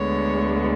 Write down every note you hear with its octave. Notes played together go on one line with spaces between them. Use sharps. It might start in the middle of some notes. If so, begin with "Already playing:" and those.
Already playing: D2 D3 G#3 B3 C#5